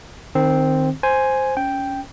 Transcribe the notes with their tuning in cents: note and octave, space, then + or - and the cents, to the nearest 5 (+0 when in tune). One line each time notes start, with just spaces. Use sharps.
D#3 -25 C4 +0
C5 +0 G#5 +0
C#4 +15 G5 +0